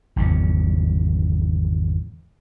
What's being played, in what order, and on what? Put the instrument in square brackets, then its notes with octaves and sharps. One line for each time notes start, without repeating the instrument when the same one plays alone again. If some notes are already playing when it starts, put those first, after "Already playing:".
[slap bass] G#1 E2 C#3